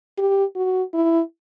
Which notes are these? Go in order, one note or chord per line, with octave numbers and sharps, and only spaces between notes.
G4
F#4
E4